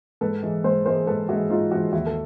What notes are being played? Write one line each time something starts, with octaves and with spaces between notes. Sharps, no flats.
G#2 A4 B4
E3 G#3
G#2 C5
E3 G#3 A#4 C5
G#2 A4 B4
E3 G#3 E4 F#4
G#2 D#4 F4
E3 G#3 E4 F#4
D#2 E4 F#4
A4